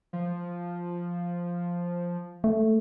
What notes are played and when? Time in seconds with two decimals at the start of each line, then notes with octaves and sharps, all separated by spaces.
0.13 F3
2.44 A3